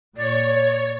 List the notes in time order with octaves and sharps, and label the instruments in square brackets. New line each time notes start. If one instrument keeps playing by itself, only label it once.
[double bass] A#2 [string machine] C#5 [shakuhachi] D5